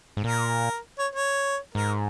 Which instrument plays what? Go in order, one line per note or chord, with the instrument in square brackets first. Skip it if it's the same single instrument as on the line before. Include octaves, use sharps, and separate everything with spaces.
[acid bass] G#2
[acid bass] A#2 [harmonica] A#4
[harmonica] C#5
C#5
[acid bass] G#2 [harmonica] A#4